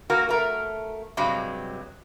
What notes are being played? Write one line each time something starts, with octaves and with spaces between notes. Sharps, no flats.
A#3 F#4 A#4
A3 A#4
G2 C3 F#3 G#3